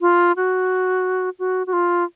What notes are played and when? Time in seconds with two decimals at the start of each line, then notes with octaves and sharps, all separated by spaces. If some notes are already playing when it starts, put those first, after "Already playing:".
0.01 F4
0.37 F#4
1.39 F#4
1.67 F#4
1.73 F4